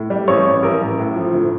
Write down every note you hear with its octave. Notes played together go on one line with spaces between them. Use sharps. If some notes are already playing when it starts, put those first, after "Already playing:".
Already playing: A2
G3
A1 C#5
A1
A1 A#4
A1
A2
F3
D2